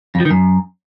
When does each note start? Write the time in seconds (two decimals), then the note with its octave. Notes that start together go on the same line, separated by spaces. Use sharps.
0.15 F2
0.20 F3
0.25 D#3
0.31 F#2